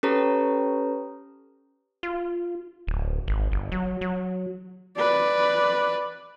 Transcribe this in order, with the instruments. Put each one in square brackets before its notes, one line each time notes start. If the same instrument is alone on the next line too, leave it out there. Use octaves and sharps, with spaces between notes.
[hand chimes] C#4 G4 A4 B4 C#5 A#5
[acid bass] F4
D1
G#1
G1
F#3
F#3
[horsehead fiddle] B4 D5